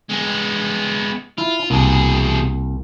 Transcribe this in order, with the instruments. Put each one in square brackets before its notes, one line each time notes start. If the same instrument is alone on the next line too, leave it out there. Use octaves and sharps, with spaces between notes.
[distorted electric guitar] G#3 B3
[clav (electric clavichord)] E4 [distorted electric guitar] F4
[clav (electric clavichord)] C2 A#3 [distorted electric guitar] B2 G#4